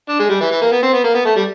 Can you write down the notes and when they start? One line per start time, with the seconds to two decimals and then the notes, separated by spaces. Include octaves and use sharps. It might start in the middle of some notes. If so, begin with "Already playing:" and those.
0.09 D4
0.19 G#3
0.29 G3
0.41 E3
0.51 E3
0.62 A#3
0.72 B3
0.83 C4
0.93 B3
1.04 A#3
1.15 B3
1.25 A3
1.36 G3